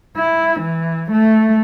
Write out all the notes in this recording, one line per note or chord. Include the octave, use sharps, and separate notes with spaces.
E4
E3
A3